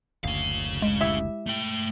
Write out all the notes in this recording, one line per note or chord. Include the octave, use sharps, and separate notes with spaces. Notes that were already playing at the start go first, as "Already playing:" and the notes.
F#1 D2 C#4 F5
G#3 E7
E4 G4 E5
A3 G5